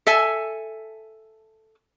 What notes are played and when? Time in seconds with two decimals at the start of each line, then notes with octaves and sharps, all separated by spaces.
0.07 A4 E5 G#5